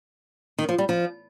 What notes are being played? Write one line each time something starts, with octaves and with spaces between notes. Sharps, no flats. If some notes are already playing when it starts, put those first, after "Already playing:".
D#3
F3
G3
F3